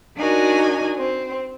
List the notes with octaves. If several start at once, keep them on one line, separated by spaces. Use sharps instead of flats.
D4 D#4 F#4 A#4 G#5
C4